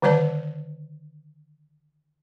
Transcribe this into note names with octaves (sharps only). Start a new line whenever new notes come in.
D3 D#3 G3 B4 D5 A5